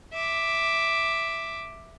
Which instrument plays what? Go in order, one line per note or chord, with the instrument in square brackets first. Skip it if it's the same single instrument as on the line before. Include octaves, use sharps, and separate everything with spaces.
[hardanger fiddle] E5 D6